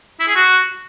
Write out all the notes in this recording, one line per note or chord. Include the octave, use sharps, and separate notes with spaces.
E4
G#4
F#4